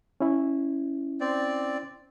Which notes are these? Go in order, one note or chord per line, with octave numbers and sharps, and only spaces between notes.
C#4 E4
C4 D5